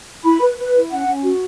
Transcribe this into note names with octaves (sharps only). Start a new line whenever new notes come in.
E4 B5
B4
B4
E4
C#4 F#5
C#4
F#4